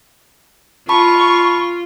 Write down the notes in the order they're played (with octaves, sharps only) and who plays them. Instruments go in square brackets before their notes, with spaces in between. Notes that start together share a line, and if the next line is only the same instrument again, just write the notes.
[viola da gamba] F4 [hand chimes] A5 B5 [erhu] C#6